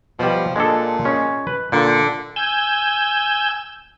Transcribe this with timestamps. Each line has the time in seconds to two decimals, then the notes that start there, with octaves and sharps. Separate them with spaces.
0.19 B2 F3 G3
0.56 A#2 G#3 D4 A4
1.05 G#3 C#4
1.47 B4
1.72 A#2 D3
2.36 G#5 E6 G6